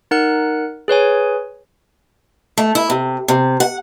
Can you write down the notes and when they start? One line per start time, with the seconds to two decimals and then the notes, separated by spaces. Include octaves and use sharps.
0.11 D#4 A#4 F#5 F#6
0.88 G#4 B4 C#5 G#5
2.58 A3
2.75 E4
2.90 C3
3.28 C3
3.60 F#5